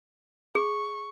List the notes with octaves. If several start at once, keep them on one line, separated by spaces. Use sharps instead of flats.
G#4 C#6